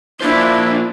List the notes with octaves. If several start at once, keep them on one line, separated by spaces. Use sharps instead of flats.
A#3 D4 E4 F4 C5